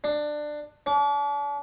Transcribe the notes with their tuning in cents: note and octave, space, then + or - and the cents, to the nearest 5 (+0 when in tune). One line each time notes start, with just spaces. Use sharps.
D4 +20
D4 -40